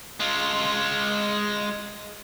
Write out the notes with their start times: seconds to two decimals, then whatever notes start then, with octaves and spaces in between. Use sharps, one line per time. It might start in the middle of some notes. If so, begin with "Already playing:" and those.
0.20 G#3 F4